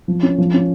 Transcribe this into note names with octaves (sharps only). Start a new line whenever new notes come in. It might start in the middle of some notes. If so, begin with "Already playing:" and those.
F3
C#4
F3
C#4